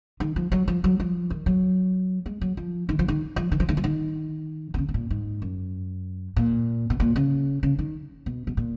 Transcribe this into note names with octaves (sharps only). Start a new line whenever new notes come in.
D#3
F3
F#3
F3
F#3
F3
D#3
F#3
G#3
F#3
F3
D#3
F3
D#3
F3
D#3
F3
D#3
F3
D#3
B2
C#3
B2
A#2
G#2
F#2
A#2
B2
A#2
C#3
C#3
D#3
B2
B2
A#2